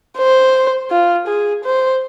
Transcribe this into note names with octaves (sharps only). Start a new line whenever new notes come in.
C5
F4
G#4
C5